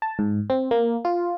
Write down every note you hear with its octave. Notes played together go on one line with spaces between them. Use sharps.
A5
G#2
C4
A#3
F4